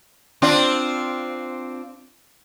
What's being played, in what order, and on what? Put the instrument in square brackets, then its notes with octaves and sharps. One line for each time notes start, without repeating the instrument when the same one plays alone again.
[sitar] C4 D4 F4